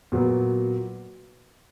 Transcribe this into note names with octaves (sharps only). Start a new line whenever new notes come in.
A#2 F#3 B3